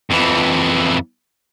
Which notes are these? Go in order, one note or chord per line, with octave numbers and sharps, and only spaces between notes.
F2 E3